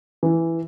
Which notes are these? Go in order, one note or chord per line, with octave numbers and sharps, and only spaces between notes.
E3